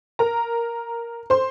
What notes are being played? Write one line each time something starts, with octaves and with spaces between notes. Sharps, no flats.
A#4 A#5
C5 C6